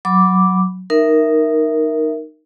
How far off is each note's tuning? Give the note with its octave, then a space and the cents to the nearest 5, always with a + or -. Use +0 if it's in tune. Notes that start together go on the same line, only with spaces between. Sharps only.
F#3 +0 B5 +0 D6 -5
D#4 -10 A#4 +0 E5 +0